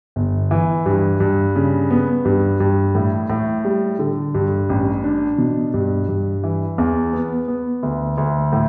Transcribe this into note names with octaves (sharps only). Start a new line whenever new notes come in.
G1
E3
G2
G2
C#3
B3
G2
G2
A2
A2
G3
D3
G2
A1
D4
B2
G2
G2
E3
E2
B3
B3
D2
D2
A2